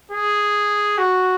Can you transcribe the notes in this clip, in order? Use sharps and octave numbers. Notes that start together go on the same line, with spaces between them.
G#4
F#4